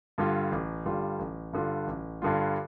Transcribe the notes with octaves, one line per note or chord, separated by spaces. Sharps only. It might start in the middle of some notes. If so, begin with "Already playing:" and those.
G2 D3 G3 F4
A1
G2 D3 G3 F4
A1
G2 D3 G3 F4
A1
G2 D3 G3 F4